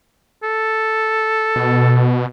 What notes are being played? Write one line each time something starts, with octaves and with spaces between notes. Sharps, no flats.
A4
B2